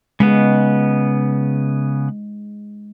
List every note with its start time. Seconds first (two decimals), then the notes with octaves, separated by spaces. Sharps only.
0.20 C#3 G#3 B3